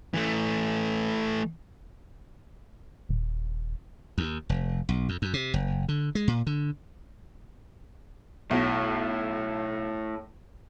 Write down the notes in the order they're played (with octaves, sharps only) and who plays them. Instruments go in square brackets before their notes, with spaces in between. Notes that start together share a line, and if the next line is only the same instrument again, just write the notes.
[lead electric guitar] E3 A3
[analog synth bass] D#1
[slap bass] D#2
F1
B1
F2
F#2
C3
F#1
D3
G#3
A#2
D3
[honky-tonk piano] B1 [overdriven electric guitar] A2